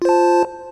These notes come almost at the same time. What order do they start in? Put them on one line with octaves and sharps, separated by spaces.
F4 C5 A5